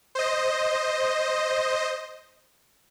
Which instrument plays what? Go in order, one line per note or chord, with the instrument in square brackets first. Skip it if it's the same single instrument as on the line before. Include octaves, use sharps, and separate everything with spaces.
[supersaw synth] C5 D#5